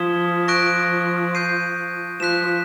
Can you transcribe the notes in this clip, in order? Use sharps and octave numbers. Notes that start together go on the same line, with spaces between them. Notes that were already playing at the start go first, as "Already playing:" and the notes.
Already playing: F3 D#6 G#6 B6 E7 G7
C#6 F#6 A#6 D7
G6 C7 D#7
F3 F#6 B6 E7